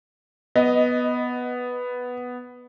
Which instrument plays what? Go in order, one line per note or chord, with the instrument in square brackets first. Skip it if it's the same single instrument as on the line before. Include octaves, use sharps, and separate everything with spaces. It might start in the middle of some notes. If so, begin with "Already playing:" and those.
[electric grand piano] B3 [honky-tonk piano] D#5